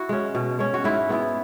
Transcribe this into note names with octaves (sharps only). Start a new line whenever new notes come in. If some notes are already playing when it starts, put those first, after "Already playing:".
Already playing: E4 F#4
G#3 C#4
B2
G#3 C#4
F#4
G#2 E4
G#3 B3 E4